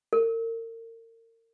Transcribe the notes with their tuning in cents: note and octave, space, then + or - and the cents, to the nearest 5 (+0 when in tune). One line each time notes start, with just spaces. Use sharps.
A#4 -35